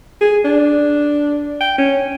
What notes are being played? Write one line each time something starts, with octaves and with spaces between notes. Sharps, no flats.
G#4
D4
G5
C#4